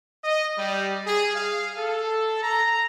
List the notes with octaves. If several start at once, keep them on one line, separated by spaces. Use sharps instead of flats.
D#5
G3
G#4
F5
A4
A#5